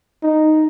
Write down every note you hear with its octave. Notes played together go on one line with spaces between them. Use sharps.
D#4